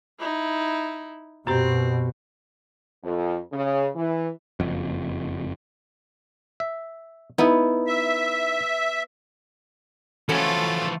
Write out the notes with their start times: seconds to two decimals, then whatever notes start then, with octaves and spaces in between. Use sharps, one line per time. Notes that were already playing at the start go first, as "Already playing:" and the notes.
0.19 D#4 E4
1.47 F#2 B2 C4 G4
3.04 F2
3.52 C#3
3.96 E3
4.60 F#1 F2
6.60 E5
7.38 B3 D#4 E4
7.87 E5
10.29 E3 F3 A3 C#4 F4 F#4 A4